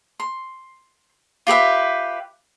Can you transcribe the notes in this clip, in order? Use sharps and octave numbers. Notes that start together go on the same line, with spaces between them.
C6
F4 G4 B4 E5